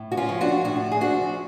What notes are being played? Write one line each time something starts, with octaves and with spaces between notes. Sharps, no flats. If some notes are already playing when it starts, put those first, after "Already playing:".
Already playing: A2
F#4
C#4 F4
F3
D4 F#4
A2 D4 F#4
G#4
F3 D4 F#4